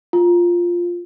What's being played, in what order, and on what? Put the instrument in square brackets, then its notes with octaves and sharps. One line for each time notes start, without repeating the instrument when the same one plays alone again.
[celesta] F4